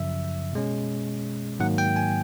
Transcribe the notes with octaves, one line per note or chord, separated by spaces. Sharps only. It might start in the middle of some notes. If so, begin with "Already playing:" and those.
Already playing: F#2 C#3 F3 E5
B2 G#3 C#4
G#2 D#3 F#3 A#3 F#5
G5
G#5